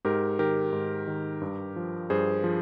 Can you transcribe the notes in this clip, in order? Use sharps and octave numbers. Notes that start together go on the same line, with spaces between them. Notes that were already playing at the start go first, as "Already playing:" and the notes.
G#2 G4 A#4
D#3 G4 A#4
G#2
D#3
G2
F3
G2 G#4 C5
F3